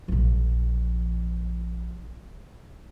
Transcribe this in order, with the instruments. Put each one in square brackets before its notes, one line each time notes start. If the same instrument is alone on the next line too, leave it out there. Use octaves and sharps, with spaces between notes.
[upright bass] A#1 F3